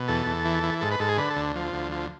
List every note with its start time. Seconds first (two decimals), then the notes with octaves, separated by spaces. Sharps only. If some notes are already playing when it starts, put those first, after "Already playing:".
Already playing: B2
0.08 E2 A4
0.26 E2
0.45 E3
0.63 E3
0.81 G#2 A4
0.91 B4
0.99 G#2 A4
1.09 G#4
1.18 D3 B4
1.30 A4
1.36 D2
1.56 F3
1.73 D2
1.92 F3